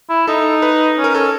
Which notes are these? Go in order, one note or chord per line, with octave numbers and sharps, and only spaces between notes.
E4
D#4 A4
B4
C#4
A#4
C#4 A4